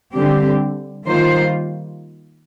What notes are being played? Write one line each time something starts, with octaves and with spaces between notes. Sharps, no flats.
D3 G3 C4 G4
D#3 G3 A#3 F4 C5